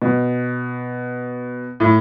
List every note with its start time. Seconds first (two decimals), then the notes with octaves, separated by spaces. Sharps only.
0.02 B2
1.80 A2